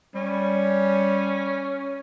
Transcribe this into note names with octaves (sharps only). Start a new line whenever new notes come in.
G3 C#4